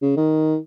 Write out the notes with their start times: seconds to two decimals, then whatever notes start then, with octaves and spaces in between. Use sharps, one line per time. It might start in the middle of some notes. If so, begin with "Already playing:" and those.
0.02 C#3
0.17 D#3